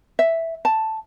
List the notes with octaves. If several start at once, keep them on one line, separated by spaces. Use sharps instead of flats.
E5
A5